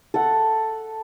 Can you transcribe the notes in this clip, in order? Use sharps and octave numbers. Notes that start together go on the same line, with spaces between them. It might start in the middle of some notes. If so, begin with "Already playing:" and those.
A4 F#5